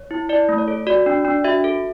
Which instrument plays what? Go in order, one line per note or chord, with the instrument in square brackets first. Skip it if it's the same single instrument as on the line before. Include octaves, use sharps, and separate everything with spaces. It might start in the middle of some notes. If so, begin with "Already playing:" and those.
Already playing: [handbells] C#5
E4
E4 D5
A3
C#5
A4
F#4 D5
D4
D4
F#4 E5
A4